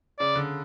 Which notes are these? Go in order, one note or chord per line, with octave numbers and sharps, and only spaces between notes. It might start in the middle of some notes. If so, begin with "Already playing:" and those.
C#3 D5
D3